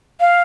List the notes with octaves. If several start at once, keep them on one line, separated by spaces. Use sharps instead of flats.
F5